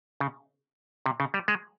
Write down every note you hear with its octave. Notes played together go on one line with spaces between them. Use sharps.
C#3
C3
C#3
G3
G#3